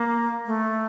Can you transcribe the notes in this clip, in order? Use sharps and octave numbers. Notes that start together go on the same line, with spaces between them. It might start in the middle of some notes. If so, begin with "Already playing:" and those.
Already playing: A#3
A3